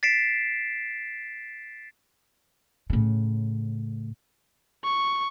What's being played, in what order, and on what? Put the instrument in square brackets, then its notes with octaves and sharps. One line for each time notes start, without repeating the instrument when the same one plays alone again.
[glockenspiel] A6 B6 C7 D7 E7
[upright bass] A2 C#3
[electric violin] C#6